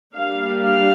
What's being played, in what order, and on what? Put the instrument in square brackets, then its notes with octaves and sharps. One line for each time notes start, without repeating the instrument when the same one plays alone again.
[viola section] G3 A#3 D4 F5
F5